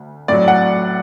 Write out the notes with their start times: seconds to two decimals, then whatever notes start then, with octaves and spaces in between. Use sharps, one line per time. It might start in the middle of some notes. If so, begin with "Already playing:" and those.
Already playing: D2
0.28 A2 F#3 D5
0.48 F#5